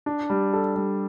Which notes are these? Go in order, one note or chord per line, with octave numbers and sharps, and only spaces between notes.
D4
G3
A4
G3